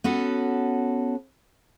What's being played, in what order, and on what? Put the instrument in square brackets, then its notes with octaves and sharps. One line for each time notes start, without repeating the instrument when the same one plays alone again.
[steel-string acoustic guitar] B3 C#4 F#4 A4